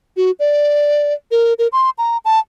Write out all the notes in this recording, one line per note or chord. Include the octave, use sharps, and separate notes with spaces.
F#4
D5
A#4
A#4
C6
A#5
A5